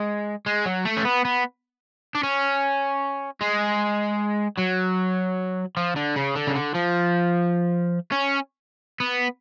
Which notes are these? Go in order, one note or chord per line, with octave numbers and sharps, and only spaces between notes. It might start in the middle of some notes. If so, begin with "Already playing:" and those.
Already playing: G#3
G#3
F#3
A3
C#4
B3
B3
D4
C#4
G#3
F#3
F3
D3
C#3
D3
C#3
D3
F3
C#4
B3